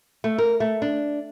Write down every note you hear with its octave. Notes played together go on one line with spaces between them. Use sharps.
A3
A#4
A3
D4